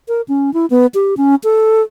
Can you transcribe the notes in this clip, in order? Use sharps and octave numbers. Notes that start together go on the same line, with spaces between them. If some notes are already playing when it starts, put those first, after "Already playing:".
A#4
C#4
E4
B3
G4
C#4
A4